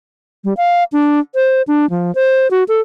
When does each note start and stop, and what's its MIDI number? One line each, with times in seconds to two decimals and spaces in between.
0.44 0.54 55
0.57 0.84 77
0.92 1.20 62
1.35 1.62 72
1.68 1.89 62
1.90 2.14 53
2.15 2.50 72
2.51 2.64 66
2.68 2.81 69